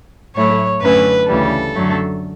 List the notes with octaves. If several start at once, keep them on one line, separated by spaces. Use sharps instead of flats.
A2 F#3 A3 E4 C#5
F#2 D3 A3 C#4 E4 B4
D2 C#3 E3 G3 A4
F#2 D3 F#3 A3